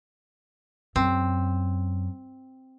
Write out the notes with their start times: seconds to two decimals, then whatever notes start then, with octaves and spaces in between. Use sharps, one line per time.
0.96 F#2 C4